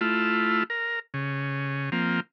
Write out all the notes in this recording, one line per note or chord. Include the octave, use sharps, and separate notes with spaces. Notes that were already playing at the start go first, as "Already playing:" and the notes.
A3 E4 F4
A#4
C#3
F3 A#3 C4